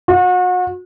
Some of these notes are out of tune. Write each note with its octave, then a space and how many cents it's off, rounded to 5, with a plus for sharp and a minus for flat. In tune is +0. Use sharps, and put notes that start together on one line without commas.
F#4 -35